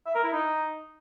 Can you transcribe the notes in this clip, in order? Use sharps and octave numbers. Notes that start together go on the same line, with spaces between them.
E5
A#4
E4
D#4